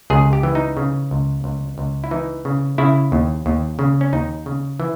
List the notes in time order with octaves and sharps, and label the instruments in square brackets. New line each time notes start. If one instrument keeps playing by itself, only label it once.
[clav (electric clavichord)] C#2 G#4
G4
E3
D#4
C#3
C#2
C#2
C#2
E4
E3 D#4
C#3
C#3 E4
D#2
D#2
C#3
C#4
D#2 D#4
C#3
E3